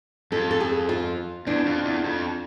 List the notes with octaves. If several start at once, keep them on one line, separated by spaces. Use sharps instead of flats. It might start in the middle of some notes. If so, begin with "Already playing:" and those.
F2 A4
A4
G#4
F4
E2 D4
F2
E2
F2